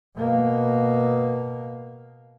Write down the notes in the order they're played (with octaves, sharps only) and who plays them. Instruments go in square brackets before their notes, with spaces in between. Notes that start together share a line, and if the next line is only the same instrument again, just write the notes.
[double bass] B2 A#3